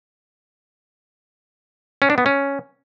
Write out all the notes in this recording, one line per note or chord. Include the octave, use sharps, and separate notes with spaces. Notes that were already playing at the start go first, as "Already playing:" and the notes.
C#4
D4
B3
C#4